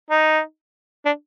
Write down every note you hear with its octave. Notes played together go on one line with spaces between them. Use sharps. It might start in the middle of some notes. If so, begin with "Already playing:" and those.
D#4
D4